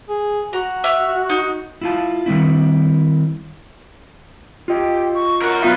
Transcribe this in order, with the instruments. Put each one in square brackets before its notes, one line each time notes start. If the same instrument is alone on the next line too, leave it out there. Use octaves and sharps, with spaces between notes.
[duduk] G#4
[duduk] F#4 [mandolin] A#5
[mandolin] E5 F6
D#4
[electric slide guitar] E4 F4 A5
D#3 G3 C4 E4
[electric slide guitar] F4 D#5 [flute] G4
[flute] C#6
[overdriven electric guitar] F#4 A#4
[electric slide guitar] F#3 B3 E5 [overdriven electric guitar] D#4 B4 [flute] F4